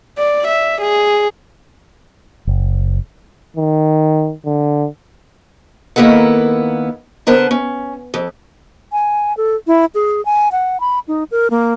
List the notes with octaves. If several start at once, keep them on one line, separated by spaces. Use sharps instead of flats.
D5
E5
G#4
F#1
D#3
D3
D#3 A#3 B3 E4 A4 F#5
D3 B3 A#4 C5 A5
C#4
F2
G#5
A4
E4
G#4
G#5
F#5
B5
D#4
A#4
A#3